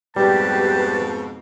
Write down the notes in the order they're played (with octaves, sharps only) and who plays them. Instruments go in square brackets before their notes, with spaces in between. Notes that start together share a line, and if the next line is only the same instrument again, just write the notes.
[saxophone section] F2 G#2 B2 [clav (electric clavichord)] G3 [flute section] G4 B4 [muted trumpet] A5